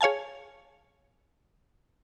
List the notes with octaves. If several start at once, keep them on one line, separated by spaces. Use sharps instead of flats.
G#4 C#5 F5 G#5 A5